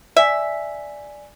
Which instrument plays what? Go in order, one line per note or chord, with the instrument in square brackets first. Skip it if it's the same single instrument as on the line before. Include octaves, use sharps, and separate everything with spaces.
[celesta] D5 G#5 B6 [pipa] E5